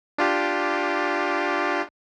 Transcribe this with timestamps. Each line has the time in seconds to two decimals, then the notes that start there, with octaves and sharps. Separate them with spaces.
0.18 D4 F4 G4